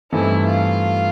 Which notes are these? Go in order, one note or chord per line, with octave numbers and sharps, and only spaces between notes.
G2 E3 A3 C4 D#4 E4
F4